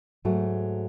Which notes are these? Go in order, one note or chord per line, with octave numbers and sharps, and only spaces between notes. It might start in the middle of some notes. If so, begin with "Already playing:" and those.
G#2 F#3 A3 F#4